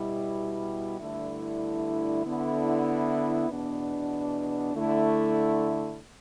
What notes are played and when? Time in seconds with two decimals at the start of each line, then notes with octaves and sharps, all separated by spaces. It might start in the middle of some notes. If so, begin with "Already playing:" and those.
Already playing: B2 G3 E4
1.00 G2 D3 A3 E4
2.25 D3 B3 E4
3.50 E2 B2 B3 D4
4.75 D3 A3 E4